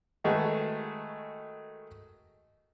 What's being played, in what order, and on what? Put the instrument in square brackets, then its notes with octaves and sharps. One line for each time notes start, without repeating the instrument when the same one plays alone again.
[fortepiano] D#3 G#3 A3 F#4 G#4 B4